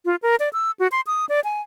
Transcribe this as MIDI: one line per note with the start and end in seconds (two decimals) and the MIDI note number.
0.05 0.16 65
0.22 0.36 70
0.40 0.49 74
0.53 0.71 88
0.79 0.87 66
0.92 1.01 84
1.07 1.25 87
1.29 1.40 74
1.44 1.61 80